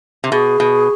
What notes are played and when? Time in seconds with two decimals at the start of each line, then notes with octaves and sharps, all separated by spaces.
0.24 C3
0.32 B2 G#4
0.60 B2